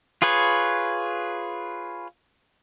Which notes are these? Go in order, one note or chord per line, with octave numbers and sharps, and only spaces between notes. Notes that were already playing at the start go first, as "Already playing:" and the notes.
F4 G#4 B4 C#5